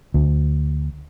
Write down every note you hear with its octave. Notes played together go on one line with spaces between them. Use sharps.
D2